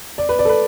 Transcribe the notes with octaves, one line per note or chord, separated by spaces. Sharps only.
D5
B4
D5
A4
B4